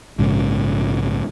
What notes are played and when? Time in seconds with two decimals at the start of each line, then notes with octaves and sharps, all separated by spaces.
0.18 A#1 G#2 C#3